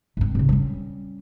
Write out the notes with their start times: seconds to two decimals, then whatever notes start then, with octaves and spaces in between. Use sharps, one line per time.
0.17 G#2 C4
0.35 A2 C#3
0.49 G3 C#4